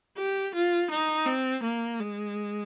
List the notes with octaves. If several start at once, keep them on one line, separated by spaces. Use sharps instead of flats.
G4
F4
D#4
C4
A#3
G#3